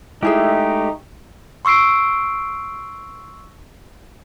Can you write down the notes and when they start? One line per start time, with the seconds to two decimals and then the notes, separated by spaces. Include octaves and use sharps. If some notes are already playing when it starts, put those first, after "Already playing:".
0.23 G#3 A3 D#4 E4 G4 G#4 E5
1.65 C6 C#6 E6 C7 D7